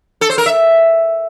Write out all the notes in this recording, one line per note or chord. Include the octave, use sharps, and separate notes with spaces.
A4
C5
A#4
E5